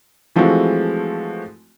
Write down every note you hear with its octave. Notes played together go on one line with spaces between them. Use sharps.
E3 F3 G#3 A3 C4 F#4